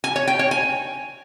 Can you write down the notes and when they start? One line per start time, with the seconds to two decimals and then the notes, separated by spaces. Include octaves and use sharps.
0.04 G#5
0.16 C#5
0.27 G5
0.39 C#5
0.51 G#5